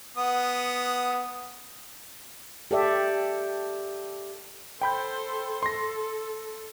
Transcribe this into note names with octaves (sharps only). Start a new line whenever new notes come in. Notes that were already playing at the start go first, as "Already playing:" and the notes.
B3 F#5 D#6
G4 A4 D5 E5
A4 C5 G5 B5 G6
A4 C6 A#6